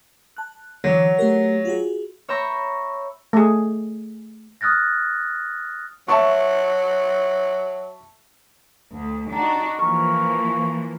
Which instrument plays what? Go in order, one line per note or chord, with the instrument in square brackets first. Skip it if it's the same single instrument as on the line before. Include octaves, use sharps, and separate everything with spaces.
[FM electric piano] A5 F#6
[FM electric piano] D3 E3 [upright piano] F#3
[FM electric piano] A3 G4 A#4
F4 F#4 G#4
[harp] C#5 E5 G5 A#5 B5 C#6
[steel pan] A3 G#4
[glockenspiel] D#6 F6 F#6 A6 A#6
[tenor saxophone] F#3 [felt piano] E5 A5 C#6
[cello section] D2
[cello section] D4 D#4 F#4 [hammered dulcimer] G5 A#5
[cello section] E3 F3 A#3 [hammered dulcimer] A#4 [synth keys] C#6